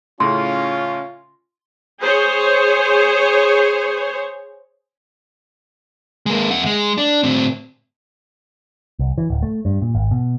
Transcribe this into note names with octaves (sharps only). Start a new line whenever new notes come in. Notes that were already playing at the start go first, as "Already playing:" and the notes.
A2 C#3 C#4 F4 C6
G#4 C5 C#5
G#3 A#3
F2 F#5
G#3
D4
A2 C4
C2
E3
D1
A3
G2
A#2
G#1
B2